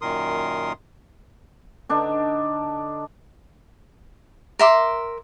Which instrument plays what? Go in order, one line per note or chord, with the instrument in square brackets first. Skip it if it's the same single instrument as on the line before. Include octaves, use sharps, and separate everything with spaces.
[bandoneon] F#2 A#2 D#3 A#4 C6 D#6
[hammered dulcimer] D3 D4 D#4
[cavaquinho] A#4 E5 C6 D6